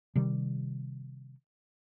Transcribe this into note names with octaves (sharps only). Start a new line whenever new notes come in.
C3 D#3 G3